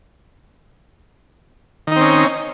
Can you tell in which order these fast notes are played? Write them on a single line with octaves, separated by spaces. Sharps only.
D#3 D#4 C4 C#4